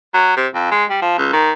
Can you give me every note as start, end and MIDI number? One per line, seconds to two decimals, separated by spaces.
0.14 0.35 54
0.37 0.47 48
0.54 0.68 41
0.71 0.84 56
0.90 1.01 55
1.02 1.18 53
1.18 1.32 37
1.33 1.52 51